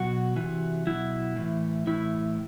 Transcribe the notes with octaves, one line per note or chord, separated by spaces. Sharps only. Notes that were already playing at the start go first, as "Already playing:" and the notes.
Already playing: B2 F#3 F#4
C3 E3
B2 F#3 E4
A2 E3
A2 E3 E4